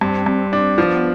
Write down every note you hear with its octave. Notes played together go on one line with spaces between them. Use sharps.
G2 C4
G2 C4
C4 D4
F3 B3